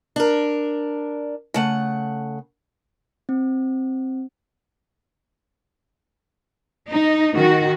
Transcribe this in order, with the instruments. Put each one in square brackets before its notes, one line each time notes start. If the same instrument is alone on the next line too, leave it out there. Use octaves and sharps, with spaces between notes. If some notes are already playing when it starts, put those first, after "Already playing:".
[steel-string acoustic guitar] D4 A#4
C#3 A3 F#5
[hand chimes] C4
[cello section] D#4
D#3 F#4